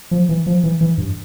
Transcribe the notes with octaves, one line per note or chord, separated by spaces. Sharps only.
F3
E3
F3
E3
E3
G2